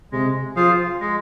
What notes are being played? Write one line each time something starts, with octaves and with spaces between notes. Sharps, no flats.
C3 G#3
F3 F4 G#4 C5 F5
G#3